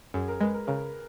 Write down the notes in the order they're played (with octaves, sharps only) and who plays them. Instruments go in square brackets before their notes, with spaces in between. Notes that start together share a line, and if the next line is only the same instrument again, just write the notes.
[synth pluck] F#2 [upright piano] G#4
[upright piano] A#4
[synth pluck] G#3 [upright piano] B4
[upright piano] A#4
[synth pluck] C#3 [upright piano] A#4